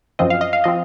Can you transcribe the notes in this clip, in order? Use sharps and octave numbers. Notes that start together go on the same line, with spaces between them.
F#2 F3 C4 D#5
F5
D#5
F5
F3 C4 D#5